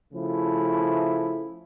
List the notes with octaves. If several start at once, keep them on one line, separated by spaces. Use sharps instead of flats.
C#3 F3 A3 E4